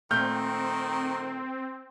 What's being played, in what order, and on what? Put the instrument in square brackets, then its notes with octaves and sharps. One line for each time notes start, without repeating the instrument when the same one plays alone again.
[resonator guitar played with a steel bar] A#2 A3 [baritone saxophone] D#3 [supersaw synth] C4 [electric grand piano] F6 G6